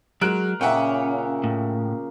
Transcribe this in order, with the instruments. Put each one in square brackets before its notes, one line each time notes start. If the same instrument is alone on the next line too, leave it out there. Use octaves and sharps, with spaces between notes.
[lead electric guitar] F#3 [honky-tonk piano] G#3 F#6 D7 [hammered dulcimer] A#4
[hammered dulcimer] A#2 C#3 D6 [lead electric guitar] C#4 [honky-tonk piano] E5 F#5 G5
[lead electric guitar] A2